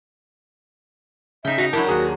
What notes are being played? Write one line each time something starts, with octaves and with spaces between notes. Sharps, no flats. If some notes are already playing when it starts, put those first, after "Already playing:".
C#3 D#4 E5 G5
D#4 F#4 A#5
F#3 D4 E4 G4 A#4 A5
D#2 F#4 G#4 A#5